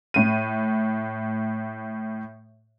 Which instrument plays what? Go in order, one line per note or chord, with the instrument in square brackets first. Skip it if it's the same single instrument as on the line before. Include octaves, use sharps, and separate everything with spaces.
[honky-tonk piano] A2 D#7